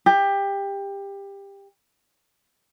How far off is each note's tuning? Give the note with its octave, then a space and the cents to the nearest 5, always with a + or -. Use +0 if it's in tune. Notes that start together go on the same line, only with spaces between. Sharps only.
G4 +20